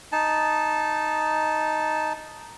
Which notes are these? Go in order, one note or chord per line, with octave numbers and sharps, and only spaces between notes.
D#4 A5